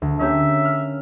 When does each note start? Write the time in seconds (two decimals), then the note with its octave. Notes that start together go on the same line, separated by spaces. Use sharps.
0.02 D2
0.19 A#3 C#4 G4 E5
0.65 F6